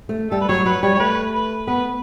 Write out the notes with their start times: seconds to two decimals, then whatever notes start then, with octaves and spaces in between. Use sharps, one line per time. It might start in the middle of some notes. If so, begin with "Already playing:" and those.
0.09 A3
0.31 G3 A4
0.41 B4
0.49 F#3 C#5
0.66 F#3 B4
0.83 G3 C#5
0.95 C#5
1.00 A3 B4
1.34 B4
1.67 B3 B4